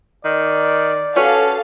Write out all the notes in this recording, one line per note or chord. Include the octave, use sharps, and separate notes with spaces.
D#3 D5
C#4 F#4 A4 B4 C#5 F5